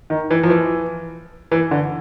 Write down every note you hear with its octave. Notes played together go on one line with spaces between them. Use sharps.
D#3
E3
F3
E3
E3
D3